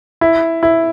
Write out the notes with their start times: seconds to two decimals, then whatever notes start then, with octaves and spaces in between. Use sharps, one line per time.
0.21 E4
0.63 E4